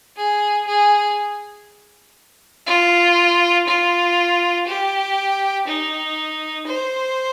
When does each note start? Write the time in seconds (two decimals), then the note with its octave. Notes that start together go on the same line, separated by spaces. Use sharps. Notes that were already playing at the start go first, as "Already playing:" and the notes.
0.17 G#4
0.67 G#4
2.67 F4
3.68 F4
4.68 G4
5.67 D#4
6.67 C5